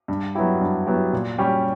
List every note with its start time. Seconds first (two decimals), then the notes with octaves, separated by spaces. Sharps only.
0.08 G2
0.35 F#3 B3 E4 G4
0.61 G2
0.87 F#3 B3 E4 G4
1.13 A#2
1.38 G3 C#4 G4